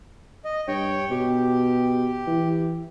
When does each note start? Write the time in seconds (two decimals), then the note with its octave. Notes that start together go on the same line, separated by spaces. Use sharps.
0.44 D#5
0.68 G2 C#5 G5
1.10 B2 G4
2.27 E3